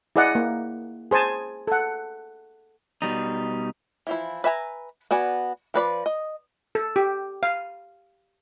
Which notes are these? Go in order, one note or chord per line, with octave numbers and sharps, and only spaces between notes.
E4 G#4 D5 D#5 F#5
A#3
G#4 C5 G#5 A5
A4 F#5
B2 G3 D#4
E3 F3 E4
B4 E5 G#5 A#5
B3 F#4 D5 G#5
F3 B4 D5 B5
D#5
A4
G4
F5